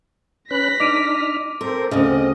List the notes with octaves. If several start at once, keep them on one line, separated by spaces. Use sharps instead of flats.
C#4 B4 F#6 A#6 B6
D4 D#4 D6 F6 D7 D#7
C4 A4 A#4 C5
D2 C#3 C4 D#5